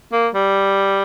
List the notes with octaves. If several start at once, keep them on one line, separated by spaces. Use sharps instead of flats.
A#3
G3